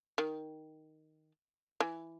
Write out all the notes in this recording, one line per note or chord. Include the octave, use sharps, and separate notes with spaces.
D#3
E3